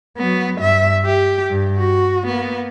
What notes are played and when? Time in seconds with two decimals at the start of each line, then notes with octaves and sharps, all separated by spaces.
0.17 F#3 B3
0.59 G2 E5
1.06 G4
1.50 G2
1.79 F#4
2.27 A#3 B3